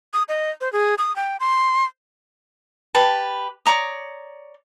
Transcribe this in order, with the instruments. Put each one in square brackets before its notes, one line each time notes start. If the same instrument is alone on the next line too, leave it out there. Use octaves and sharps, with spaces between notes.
[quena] D#6
D#5
C5
G#4
D#6
G5
C6
[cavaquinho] G4 B4 A5
C#5 D5 A#5 D#6